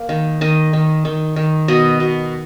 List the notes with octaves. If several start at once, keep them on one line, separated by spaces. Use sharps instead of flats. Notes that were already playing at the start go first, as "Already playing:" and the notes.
Already playing: A#3
D#3
D#3 D#5
D#3
D#3
D#3
B2 D#5
B2